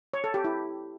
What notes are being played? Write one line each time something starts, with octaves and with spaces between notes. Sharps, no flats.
C#5
A4
G4
E4